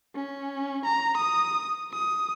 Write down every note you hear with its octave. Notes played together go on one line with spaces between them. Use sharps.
C#4
A#5
D#6
D#6